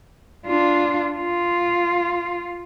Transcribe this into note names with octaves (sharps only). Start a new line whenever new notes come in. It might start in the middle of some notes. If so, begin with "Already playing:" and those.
D4 F4
F4